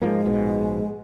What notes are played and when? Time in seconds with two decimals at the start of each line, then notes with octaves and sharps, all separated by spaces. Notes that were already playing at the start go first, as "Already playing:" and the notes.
0.02 G#2 F3 G#3 A#3
0.25 A#1 G#2 B2